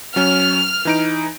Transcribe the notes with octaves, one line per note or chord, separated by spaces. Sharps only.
F#3 C#4 F6
E3 D#4 D7